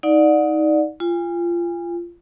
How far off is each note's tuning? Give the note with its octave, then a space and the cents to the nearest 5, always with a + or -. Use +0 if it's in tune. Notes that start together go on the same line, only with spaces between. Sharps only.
D#4 +20 D5 +10 F#5 -30
F4 -20 G#5 -35